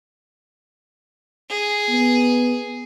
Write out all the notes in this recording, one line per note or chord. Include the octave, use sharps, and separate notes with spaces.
G#4
B3